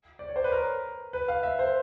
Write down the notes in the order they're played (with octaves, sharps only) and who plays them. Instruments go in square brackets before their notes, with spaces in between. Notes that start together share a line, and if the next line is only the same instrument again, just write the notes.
[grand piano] D5
C#5
C5
B4
A#4
B4
F5
E5
C5